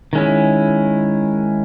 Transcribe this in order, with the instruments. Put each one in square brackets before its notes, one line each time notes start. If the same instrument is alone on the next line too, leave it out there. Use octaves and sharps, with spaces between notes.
[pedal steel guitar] D#3 G#3 C#4 E4